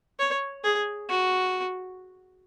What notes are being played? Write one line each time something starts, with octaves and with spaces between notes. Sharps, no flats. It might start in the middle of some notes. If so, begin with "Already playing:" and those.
C#5
G#4
F#4